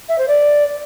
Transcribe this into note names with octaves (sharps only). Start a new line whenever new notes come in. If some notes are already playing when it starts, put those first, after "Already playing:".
E5
C5
D5